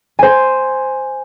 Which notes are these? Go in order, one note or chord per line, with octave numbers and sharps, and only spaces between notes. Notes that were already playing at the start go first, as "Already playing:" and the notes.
C5 G#5